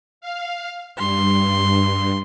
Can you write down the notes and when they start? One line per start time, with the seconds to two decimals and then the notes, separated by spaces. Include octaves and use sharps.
0.21 F5
0.98 G2 C6